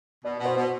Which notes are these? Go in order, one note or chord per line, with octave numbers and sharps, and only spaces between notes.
B2 D5
B2
C5
B2